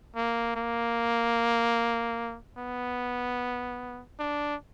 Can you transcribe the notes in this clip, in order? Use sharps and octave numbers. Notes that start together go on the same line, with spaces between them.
A#3
A#3
B3
D4